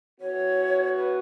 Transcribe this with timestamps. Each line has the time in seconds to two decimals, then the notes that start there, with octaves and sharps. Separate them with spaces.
0.20 E3 B3 F#4 C#5
0.97 B4